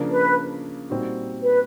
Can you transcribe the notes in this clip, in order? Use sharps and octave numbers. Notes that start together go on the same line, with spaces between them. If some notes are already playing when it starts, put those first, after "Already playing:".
Already playing: C#3 F3 A#3 D4
B4
A#2 G3 C4 D#4 F#4
B4